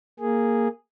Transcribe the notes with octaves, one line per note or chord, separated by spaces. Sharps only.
A#3 G#4